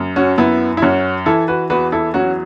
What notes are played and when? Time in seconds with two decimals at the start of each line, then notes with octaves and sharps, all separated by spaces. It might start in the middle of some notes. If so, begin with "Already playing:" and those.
Already playing: F#2
0.16 C#4 F#4
0.38 F#2 B3 E4
0.77 E4
0.82 F#2 C#4 F#4
1.26 E3 E4 A4
1.48 F#4 B4
1.70 E2 F#4 B4
1.92 E4 A4
2.14 F#3 C#4 F#4